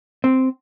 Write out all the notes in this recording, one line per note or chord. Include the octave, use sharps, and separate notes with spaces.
C4